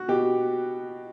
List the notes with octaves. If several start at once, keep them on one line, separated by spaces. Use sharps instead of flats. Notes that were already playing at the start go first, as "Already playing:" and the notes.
Already playing: F#4
B2 G4